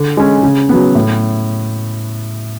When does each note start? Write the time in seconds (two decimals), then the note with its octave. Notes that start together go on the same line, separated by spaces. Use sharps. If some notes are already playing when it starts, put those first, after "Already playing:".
Already playing: D3
0.17 G#3 C#4
0.43 C#3
0.69 F#3 B3
0.95 A2